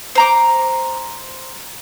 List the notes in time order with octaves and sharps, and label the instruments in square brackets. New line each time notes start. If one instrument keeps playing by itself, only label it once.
[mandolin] C5 A#5 D6